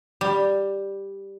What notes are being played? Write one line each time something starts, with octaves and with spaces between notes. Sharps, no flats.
G3